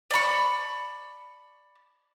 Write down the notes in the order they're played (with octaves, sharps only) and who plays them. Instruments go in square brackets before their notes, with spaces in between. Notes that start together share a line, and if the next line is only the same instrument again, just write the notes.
[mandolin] D5 A5 B5 C#6